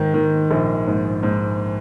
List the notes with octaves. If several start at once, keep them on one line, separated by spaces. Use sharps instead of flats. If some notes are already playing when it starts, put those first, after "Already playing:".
Already playing: G#2 D#3
D#3
A#1
G#2
G#2